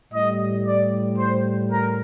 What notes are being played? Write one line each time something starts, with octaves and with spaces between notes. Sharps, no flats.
A2 G3 D#5
D5
C5
A#4